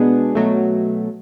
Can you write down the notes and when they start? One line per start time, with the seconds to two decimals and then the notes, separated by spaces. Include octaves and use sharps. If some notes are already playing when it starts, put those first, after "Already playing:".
Already playing: B2 G#3 B3 D4 G#4
0.35 B2 F#3 A3